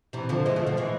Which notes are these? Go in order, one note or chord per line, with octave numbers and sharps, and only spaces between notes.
C3 E3
D3 F3
E3 G#3
F3 A3
D3 F3
E3 G#3